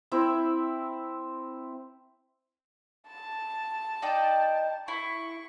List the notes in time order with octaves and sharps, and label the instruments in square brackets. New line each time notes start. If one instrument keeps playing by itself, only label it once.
[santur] C4 E4 A#4 E5
[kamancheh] A5
[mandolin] D#4 D5 G5
[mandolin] E4 [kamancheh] C#6